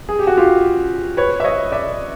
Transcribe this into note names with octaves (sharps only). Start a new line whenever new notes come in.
G#4
G4
F#4
F4 G4
B4 C#5
E5
C#5 D#5
D5 E5